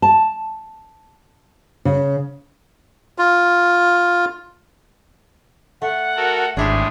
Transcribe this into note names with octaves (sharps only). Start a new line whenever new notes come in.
A5
C#3
F4
A3 F#5
F#4 A4 A#4
G#1 A2 G#3 D4 E4 G4 G#4